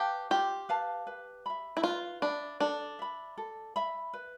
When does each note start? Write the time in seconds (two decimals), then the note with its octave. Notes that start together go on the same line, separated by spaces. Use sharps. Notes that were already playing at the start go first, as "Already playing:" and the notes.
Already playing: G4 B4 F5 A5
0.30 F4 G4
0.69 B4 F5 A5
1.07 B4
1.46 E5 B5
1.77 E4
1.83 F4 B4
2.22 D4 E5 B5
2.60 D4 A4
2.99 E5 B5
3.37 A4
3.76 E5 B5
4.13 B4